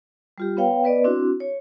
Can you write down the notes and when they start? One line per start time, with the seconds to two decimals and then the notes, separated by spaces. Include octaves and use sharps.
0.38 G3 F4 G4
0.57 B3 B4 C#5 F5 G5
0.84 B3 B4 D5 D#5
1.04 C4 D4 E4 F#4
1.40 C#5